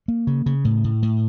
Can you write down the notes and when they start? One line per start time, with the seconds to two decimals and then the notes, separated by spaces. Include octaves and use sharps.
0.08 A#3
0.27 C#3
0.46 C#3
0.65 A2
0.84 A2
1.02 A2